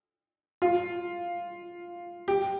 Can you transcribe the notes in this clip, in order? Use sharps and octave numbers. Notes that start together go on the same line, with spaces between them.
F4
G4